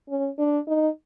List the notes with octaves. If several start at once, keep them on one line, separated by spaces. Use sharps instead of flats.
C#4
D4
D#4